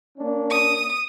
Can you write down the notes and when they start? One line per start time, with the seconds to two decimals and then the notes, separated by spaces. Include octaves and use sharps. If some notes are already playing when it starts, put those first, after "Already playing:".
0.18 A#3 C#4 D4
0.50 D#6